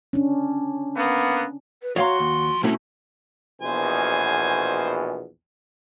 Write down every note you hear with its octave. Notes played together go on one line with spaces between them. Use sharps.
C#4 D4
A#3 B3
B4
F3 F#4 C#5 F5 A#5 C6
D#2
B2 A3 C4 C#4 E4
A#1 E2 B2 C5 G#5